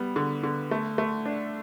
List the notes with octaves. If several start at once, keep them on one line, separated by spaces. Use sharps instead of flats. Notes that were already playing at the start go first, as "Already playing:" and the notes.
Already playing: G3 B3
D3
D3
A3
A3
D4